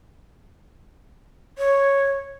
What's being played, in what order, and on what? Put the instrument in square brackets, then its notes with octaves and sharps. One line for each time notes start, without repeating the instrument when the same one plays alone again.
[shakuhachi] C#5